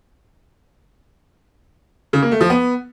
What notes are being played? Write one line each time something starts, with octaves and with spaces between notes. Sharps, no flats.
C#3
A#3
A3
F3
B3